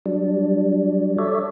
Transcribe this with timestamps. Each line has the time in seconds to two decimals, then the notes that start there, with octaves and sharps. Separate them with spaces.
0.06 F#3 G3 D4
1.18 A4 C#5 D5 E5